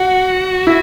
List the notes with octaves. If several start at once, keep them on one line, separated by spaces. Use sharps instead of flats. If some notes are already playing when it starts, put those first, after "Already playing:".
Already playing: F#4 F#5
E4